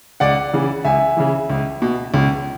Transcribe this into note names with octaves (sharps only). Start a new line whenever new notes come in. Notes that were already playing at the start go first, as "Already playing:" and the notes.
C#2 D5 F#5
C#3 E3
C#2 E5 G#5
C#3 E3
C#2
B2
C#2